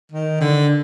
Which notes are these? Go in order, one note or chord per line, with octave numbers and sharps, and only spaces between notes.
D#3
D3